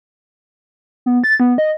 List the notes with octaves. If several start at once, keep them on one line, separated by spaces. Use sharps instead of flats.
B3
A6
B3
D#5